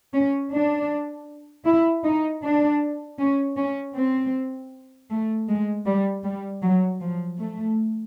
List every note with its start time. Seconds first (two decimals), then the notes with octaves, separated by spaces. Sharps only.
0.13 C#4
0.52 D4
1.66 E4
2.04 D#4
2.43 D4
3.18 C#4
3.57 C#4
3.95 C4
5.10 A3
5.48 G#3
5.86 G3
6.24 G3
6.62 F#3
7.01 F3
7.39 A3